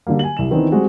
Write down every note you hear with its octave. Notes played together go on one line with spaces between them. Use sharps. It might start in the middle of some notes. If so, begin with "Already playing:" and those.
D3 F#3 G3 A#3
G#5 F#7
C2 E7
D#3 E3 B3 C4 D4 D#4
G3 G#3 C4 F#4 G#4